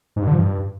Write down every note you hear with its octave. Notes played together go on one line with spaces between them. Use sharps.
G#2
G2
D3
F3
G2